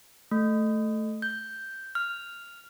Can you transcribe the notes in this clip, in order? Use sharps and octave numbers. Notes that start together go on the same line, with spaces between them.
A3
G6
F6